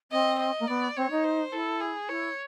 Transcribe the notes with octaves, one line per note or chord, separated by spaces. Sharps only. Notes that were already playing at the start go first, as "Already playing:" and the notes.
C4 D#5
D#5
A#3
B3 D5
C4 C#5
D#4
C5
E4 A4
G#4
E4 C#5